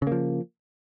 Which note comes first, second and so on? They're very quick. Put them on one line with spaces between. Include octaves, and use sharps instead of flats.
C#3 A#3 F3